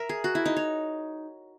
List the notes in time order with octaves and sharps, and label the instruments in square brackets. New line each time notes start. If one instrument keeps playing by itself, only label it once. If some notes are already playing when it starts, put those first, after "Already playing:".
Already playing: [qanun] A#4 E5
G#4
F#4
E4
D#4
C#5